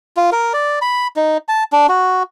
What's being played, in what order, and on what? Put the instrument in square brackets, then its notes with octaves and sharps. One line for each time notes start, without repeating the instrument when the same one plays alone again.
[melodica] F4
A#4
D5
B5
D#4
A5
D4
F#4